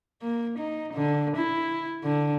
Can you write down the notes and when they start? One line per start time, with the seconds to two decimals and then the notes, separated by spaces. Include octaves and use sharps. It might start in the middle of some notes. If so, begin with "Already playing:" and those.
0.22 A#3
0.59 D#4
0.94 D3
1.37 E4
2.04 D3